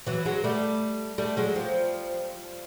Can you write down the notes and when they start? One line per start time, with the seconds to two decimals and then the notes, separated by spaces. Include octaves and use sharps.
0.06 E3 F#3
0.26 F#3 G#3
0.44 G3 A3
1.18 G3 A3
1.37 F#3 G#3
1.55 F3 G3